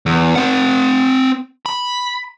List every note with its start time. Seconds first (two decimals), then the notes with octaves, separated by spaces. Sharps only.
0.06 E2
0.36 C4 F#5
1.66 B5